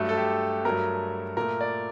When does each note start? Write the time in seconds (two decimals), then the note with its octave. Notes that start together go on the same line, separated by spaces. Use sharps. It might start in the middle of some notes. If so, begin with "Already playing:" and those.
Already playing: G2 F#3 A3
0.09 A4
0.17 G4
0.65 G2 F#3 A3 A#4
1.37 A#2 A3 A#4
1.61 D5